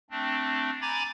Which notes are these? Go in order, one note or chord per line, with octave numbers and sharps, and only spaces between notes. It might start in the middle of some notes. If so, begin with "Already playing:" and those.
A3 C4 D4
G#5 A#5 B5 D6 G#6 A6